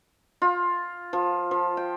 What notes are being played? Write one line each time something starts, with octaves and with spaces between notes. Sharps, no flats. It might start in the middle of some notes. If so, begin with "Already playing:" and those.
F4
F3
F3
G5